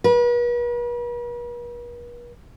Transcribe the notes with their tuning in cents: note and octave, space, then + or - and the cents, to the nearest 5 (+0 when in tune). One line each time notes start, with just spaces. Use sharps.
B4 -45